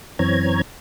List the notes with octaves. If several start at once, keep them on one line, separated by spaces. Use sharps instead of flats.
F#2 E3 C4 C#5 A#5 G#6